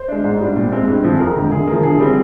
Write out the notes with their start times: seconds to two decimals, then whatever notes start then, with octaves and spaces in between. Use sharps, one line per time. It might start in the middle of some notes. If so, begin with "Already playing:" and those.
Already playing: C5
0.08 G#3 D4
0.24 G#2
0.40 G3 D4
0.56 A#2
0.72 G#3 C4
0.88 G2
1.04 F3 C4
1.14 G#4
1.20 F2 A#4
1.36 D3 G#3
1.52 D3 G#4
1.67 F3 A#3
1.83 D3 G#4
2.00 G3 C4